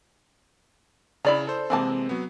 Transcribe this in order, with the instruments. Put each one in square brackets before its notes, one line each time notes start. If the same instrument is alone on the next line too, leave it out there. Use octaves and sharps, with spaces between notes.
[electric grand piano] C#3 [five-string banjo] E4 D5 A#5
[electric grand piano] A4 C5
[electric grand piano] C3 G#3 C4 [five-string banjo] E3 A#3 A5
[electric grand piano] F#3 B3